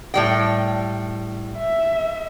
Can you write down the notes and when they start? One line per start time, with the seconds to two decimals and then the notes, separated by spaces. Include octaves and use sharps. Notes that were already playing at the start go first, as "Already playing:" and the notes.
0.14 A2 G3 G5
1.57 E5